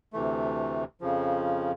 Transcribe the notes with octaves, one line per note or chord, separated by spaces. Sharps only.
D2 C3 E3 A3
F2 C#3 F3